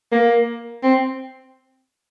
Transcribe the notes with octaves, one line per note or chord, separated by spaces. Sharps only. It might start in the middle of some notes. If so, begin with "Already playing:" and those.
A#3
C4